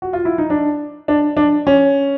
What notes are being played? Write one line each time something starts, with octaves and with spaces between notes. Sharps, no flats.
F#4
F4
E4
D#4
D4
D4
D4
C#4